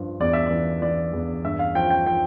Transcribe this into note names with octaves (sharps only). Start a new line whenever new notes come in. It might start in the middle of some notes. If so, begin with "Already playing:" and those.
Already playing: G2 F3
E2 D5
E5
E3 D5
E3 D5
E2
G2 E5
F5
F3 G5
G5
F3 G5